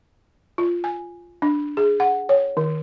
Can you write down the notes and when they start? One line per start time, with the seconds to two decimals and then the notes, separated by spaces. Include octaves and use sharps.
0.58 F4
0.84 G#5
1.42 D4
1.77 G#4
2.00 F#5
2.29 C#5
2.57 D#3